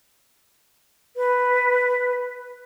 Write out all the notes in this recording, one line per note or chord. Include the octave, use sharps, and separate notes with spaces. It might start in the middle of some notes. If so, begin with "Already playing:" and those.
B4